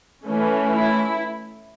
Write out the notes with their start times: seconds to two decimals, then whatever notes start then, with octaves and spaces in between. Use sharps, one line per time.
0.25 E3 A3 C#4
0.73 E4